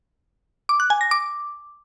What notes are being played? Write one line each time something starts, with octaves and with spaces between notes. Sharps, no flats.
D6
F#6
G#5
A#6
D6